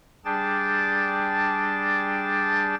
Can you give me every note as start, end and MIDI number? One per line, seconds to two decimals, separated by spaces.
0.25 2.75 55
0.25 2.75 62
0.25 2.75 68
0.25 2.75 79
0.25 2.75 81
0.25 2.75 93